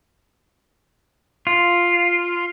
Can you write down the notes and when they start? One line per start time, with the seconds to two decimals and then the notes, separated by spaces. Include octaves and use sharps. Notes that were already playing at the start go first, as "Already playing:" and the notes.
1.47 F4